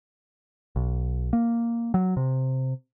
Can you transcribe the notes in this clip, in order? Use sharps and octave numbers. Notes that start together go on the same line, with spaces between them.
B1
A#3
F#3
C3